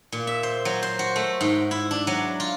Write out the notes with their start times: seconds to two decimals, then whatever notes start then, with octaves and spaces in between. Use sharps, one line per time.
0.12 A#2
0.27 E5
0.43 C5
0.65 F#3
0.83 C5
0.99 F#4
1.16 A3
1.41 G#2
1.71 E4
1.91 D4
2.07 F#3
2.40 F4